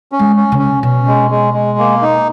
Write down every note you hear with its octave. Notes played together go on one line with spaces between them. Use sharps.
C#4
G#3
C#4
C#3
C#4
B2 C#4
G#3
G#3
G#3
A#3
D#4